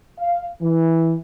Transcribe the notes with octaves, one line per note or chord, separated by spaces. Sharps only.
F5
E3